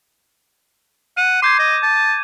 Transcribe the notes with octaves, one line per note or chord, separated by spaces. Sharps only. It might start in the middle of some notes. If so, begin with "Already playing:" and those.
F#5 D#7
C6 D6 G6 G#6
D#5
A5